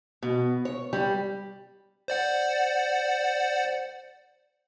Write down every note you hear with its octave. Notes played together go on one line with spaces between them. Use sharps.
B2
C#5
G3
C5 D5 F#5